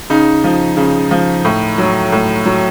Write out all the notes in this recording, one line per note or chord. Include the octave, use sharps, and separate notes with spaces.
C#3 D#4
F3
C#3
F3
A2
F#3
A2
F#3